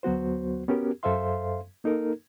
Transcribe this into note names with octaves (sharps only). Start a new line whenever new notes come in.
D2 F#3 B3 F#4 C5
B3 C#4 F#4 G4 A#4
F#2 A4 C5 E5 F5 C6
A#3 D#4 A4 A#4